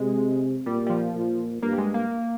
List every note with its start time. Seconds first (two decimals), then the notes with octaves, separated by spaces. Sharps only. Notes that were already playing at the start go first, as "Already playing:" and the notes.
Already playing: C3 G#3
0.66 A#2 G3
0.86 G3
0.90 F3
1.14 A#2
1.62 G2 A#3
1.73 G3
1.78 G#3
1.94 A#3